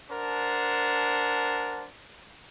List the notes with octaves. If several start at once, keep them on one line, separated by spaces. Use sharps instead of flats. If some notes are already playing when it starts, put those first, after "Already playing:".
D4 A#4 C5 F#5 A5